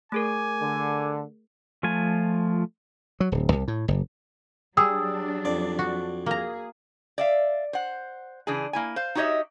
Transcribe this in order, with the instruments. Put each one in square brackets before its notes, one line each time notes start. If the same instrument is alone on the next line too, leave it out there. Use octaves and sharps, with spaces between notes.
[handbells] A3 G#4 A#4 [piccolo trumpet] G#5 [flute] D6
[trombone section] D3
[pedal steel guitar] F3 A3 F4 G#5
[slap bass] F#3
D1
C2
A2
F#1
[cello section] F#3 D4 [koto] G3 G#4 [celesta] D#6 E6
[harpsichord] F2 D5
[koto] F#4
[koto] A#3 A#5 [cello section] G#4
[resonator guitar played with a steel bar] D5 E5 F5
C5 F#5
C#3 E3 D4 G#4
A#3 E4 G#5
C5 F5
D#4 F#4 G4 C#5 D#5 E5